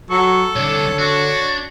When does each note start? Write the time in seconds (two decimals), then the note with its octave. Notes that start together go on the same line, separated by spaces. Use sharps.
0.10 F#3 A4 C#6
0.56 C2 D3 D4 C#5
0.99 D4 F#4